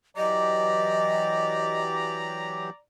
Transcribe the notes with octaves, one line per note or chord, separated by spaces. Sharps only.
E3 F#3 G4 D5 D#5 A#5